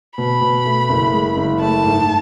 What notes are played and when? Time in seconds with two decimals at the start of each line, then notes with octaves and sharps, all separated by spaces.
0.18 B2 B5
0.41 B2
0.65 A3
0.89 F#1
1.13 G#3
1.37 F#1
1.61 A3 A5
1.85 G#2